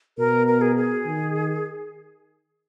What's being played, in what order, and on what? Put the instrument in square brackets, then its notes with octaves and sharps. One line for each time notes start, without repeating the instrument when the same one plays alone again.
[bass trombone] B2 [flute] A#4
[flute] A#4
G#4
G#4
[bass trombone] D#3